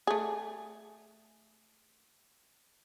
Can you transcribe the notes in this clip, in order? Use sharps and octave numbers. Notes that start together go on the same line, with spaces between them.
A3 G#4